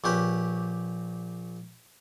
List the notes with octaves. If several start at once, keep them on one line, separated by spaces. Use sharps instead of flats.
A#1 C#4 G4 B4